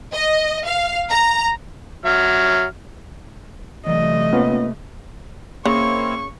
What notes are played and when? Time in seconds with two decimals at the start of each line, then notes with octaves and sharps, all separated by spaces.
0.13 D#5
0.66 F5
1.11 A#5
2.05 F#3 E5 F6
3.87 C3 E3 F#3 A3 D5 D#5
4.33 A#3 B3 C#4 F4 B4
5.66 C#3 A#3 C4 E4 C#5 C#6